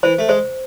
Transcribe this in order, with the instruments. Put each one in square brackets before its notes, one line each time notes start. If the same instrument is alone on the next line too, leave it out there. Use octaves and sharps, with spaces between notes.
[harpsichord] E3 [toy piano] C5
[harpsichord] A3
[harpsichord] G#3 [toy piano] C5